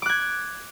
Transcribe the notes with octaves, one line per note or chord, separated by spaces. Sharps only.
D6 F#6 G#6